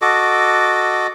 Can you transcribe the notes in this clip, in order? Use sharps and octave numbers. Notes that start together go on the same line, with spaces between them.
F#4 A4 D#5 D6